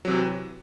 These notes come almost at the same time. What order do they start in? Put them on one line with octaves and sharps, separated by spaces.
F#3 C3 E3